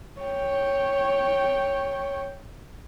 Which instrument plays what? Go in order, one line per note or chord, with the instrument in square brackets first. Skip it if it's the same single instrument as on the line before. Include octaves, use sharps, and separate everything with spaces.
[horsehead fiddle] C#5 G5